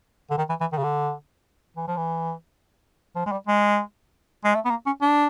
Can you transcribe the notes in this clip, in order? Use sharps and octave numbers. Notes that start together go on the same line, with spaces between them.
D3
D#3
E3
E3
D#3
C#3
D3
E3
F3
E3
F3
G#3
G3
G#3
G#3
A3
B3
A#3
C#4
D4